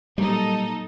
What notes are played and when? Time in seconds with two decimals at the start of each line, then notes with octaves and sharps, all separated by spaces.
0.18 A#2 F#3 G3 A#3 D#4 A4